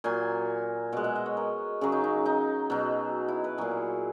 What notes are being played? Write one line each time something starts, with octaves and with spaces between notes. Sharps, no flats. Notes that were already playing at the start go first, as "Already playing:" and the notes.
A#2 F#3 G#5
B2 G#3 F#5
E5
D#5
C#5
A#4
C#3 F#3 G#4
D#4
D#4
D#4
B2 F#3
E4
B4
A#2 F#3 G#4